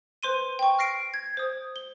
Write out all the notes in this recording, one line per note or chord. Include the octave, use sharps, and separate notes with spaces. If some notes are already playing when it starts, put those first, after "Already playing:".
B4 C5 C6 D#7
G5 C#6
F6 A#6 C7 D7
G#6
C5 D#6
G7